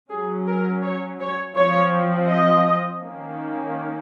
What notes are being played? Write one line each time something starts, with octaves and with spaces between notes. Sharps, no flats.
F#3 C#4 G#4
A#4
C#5
C#5
F3 C4 C#5
D#5
D#3 A#3 C#4